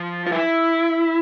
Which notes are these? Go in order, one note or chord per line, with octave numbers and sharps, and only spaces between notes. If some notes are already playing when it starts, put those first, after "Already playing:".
Already playing: F3
F4
E4